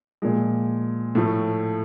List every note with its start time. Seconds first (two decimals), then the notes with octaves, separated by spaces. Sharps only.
0.22 A#2 F3 G#3
1.15 A2 F3 A3